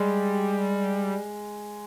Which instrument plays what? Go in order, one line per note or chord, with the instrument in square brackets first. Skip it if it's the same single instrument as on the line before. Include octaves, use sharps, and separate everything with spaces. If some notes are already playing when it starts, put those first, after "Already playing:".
Already playing: [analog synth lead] G3 [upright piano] G#3